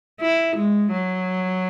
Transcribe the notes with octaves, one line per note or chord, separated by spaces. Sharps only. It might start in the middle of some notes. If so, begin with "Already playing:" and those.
E4
G#3
F#3